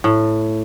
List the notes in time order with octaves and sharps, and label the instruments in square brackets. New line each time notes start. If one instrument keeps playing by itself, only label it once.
[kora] A2